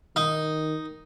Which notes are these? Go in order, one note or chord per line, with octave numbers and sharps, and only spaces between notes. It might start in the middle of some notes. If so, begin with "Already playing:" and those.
D#3 D#4